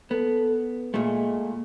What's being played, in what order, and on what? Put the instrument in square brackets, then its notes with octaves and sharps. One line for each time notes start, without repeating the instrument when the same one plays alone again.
[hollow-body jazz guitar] B3 [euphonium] A4
[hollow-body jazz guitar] A#2 A3 [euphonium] G#3